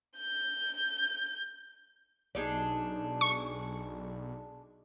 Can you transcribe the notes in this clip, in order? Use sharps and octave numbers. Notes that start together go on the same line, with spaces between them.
G6
B1 D4 D#4 G#4
C#6